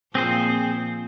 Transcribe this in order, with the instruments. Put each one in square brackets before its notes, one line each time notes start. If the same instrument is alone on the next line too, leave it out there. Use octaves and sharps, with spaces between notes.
[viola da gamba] A#2 F3 [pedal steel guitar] C4 G#4 C5